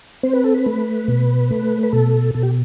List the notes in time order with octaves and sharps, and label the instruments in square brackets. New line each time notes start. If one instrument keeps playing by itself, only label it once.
[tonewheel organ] C4 C5
B4
A4
B4
A3
B2
A3
B4
B2 A4
B2 A4
G4